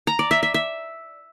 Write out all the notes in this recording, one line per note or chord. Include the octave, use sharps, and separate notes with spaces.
A#5
D5
E5
E5
E5